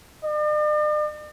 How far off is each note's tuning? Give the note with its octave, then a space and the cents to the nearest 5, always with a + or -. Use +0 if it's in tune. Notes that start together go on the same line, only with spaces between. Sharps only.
D5 +45